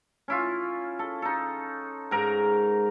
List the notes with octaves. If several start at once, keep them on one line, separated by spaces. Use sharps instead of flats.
C#4 E4 F4
A4
D#4 A4
G#2 A#4 A#5